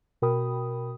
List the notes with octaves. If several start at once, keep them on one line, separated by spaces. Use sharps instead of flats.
B2 F#4 A#4 G5 B5 D#6